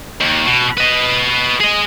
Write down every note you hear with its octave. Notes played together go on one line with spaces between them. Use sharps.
D#2
B2
B4 D#5
G#4 D#5